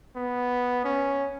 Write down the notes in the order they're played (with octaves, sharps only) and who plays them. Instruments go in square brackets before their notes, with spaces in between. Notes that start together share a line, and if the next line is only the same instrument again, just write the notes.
[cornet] B3
C#4